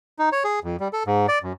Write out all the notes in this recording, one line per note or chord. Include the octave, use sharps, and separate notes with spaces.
D#4
C#5
G#4
F2
G3
A4
G#2
D5
F#2